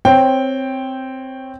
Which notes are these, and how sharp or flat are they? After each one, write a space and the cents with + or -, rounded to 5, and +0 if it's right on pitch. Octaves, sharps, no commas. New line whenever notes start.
C4 +0 C#5 -15 G5 +0